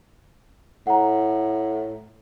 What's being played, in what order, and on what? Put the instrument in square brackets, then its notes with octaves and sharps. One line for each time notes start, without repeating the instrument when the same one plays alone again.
[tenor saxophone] A2 [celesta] F#5 A#5